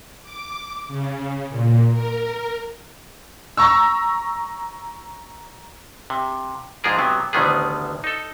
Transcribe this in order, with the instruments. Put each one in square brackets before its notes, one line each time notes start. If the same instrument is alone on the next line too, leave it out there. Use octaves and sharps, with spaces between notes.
[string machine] D6
C#3
A#2
A#4
[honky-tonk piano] A#5 C#6 E6
[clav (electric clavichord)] C3
G#2 F3 D4 G#4 A#4
C3 F#3 B3
A1 D2 D3 D#3 B3 G#4
D#4 A4